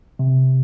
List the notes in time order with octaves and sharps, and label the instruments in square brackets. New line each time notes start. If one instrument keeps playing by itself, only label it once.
[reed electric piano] C3